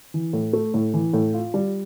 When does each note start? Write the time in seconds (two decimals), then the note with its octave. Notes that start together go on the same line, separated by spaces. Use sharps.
0.14 E3
0.33 A2
0.53 A3
0.74 A2
0.94 E3
1.13 A2
1.34 F4
1.54 G3